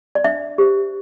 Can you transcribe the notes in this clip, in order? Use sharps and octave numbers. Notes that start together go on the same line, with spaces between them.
D5
D4 E5
G4 C5